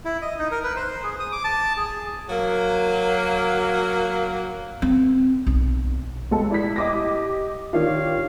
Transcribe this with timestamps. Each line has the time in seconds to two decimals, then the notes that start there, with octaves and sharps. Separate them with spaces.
0.05 E4
0.22 D#5
0.39 D#4
0.51 A#4
0.64 B4
0.76 C5
1.04 G#4
1.20 D#6
1.32 D6
1.44 A5
1.77 G#4
2.29 F#3 A#3
4.82 C4
5.47 B1
6.31 C#2 G#3 A4
6.51 E4 D5 B6
6.76 D#5 D6 A#6
6.94 G4
7.73 D#3 D4 F4 G4 C#5 F5